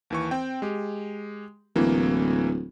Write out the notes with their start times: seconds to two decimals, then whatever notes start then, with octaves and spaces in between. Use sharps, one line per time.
0.10 D#2 E3 C#6
0.31 C4 G5
0.62 G#3 G4
1.76 D1 A2 E3 A#3